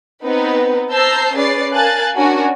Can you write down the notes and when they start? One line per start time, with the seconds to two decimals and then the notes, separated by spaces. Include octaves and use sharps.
0.23 B3 C4 D#4 B4
0.92 C5 A5 A#5 E6 G6 C7
1.35 C#4 G#4 B4 D5 A6 C7
1.73 A#4 F5 G#5 A5 F#6 A6
2.16 C#4 D4 F#4 A#4 G#5